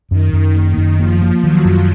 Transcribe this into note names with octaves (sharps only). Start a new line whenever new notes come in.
F#2 D#3
F#2
A#3
F#2
F3 A#3
A#3
D#3 F#3
F#2